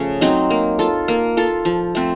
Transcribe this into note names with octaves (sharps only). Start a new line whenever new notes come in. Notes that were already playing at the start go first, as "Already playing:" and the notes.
Already playing: C#3 F3 A3 C#4
F#3 C4 D#4
A#3
F4 A4
A#3
F4 A4
F3
A3 C4